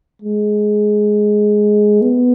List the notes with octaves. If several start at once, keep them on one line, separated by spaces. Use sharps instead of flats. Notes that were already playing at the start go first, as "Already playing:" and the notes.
G#3
B3